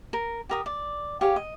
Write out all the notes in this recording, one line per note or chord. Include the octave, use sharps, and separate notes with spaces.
A#4
G4 A#4 D#6
D5
G4 G#4 C#5 F5
D#5